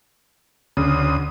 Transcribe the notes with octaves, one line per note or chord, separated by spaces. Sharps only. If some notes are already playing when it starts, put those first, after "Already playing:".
D2 C#3 D#6